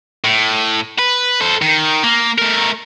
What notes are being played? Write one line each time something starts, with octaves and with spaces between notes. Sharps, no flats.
A2
B4
A4 C5
D#3
A#3
A3 A#4